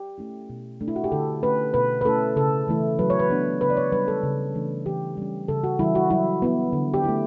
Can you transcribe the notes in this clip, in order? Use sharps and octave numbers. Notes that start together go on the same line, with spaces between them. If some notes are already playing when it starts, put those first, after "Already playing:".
Already playing: G4
A3 C#4 E4
B2
A3 D4
E4
F#4
G4
D3 A4
A3 C#4 B4
B2 B4
B4
A3 C#4 E4 A4
C#3 A4
E3 A3 E4
F#3 B4
C#5
B4
B3 D4
C#3 B4
D5
C#5
G3 D4 B4
A4
C#3
E3 A3 D4
E3 G4
G3 C#4
C#3 A4
F#4
E3 G3 E4
F#4
F#3 E4
B3 E4
D3
G4
A3 E4